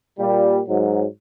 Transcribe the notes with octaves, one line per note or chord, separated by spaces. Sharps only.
A#2 G3
G#2 F#3